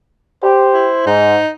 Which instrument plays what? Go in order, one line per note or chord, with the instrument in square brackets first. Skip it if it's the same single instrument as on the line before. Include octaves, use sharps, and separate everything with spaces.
[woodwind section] G4 [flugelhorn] C5
[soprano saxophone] E4
[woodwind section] G#2 [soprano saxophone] D#4